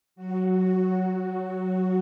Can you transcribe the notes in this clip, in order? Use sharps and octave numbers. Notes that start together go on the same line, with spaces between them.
F#3 F#4